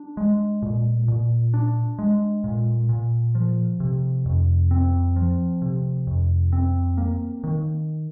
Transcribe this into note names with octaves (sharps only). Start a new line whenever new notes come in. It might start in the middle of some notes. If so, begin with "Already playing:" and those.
Already playing: D4
G#3
A#2
A#2
D4
G#3
A#2
A#2
F3
C3
F2
C4
F3
C3
F2
C4
A#3
D#3